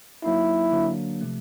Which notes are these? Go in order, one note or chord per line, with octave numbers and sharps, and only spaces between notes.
F#3 A#3 D#4 E4
D3 F#3 A#3 D4
C3 F3 A3